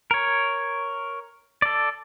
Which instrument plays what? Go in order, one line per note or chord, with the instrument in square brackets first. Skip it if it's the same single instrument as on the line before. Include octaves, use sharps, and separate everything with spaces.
[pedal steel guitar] A#4 C#5
A4 D5